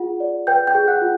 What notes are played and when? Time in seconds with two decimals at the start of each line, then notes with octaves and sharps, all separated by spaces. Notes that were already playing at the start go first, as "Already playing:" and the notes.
Already playing: F4 G#4 F#5
0.20 D5
0.47 B4 G5 G6
0.67 G5 G6
0.74 G#4
0.88 F#5 F#6
1.01 F4